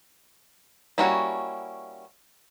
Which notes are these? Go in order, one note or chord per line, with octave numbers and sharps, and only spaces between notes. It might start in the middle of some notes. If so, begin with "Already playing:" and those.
G3 A#3 C#4 E4 F#4